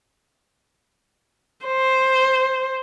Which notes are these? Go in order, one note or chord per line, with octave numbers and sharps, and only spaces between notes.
C5